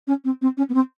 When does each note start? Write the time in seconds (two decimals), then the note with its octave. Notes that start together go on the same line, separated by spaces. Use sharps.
0.07 C#4
0.24 C4
0.41 C4
0.57 C#4
0.69 B3
0.74 C4